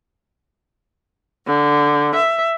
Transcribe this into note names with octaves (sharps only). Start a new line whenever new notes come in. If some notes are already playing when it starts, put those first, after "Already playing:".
D3
E5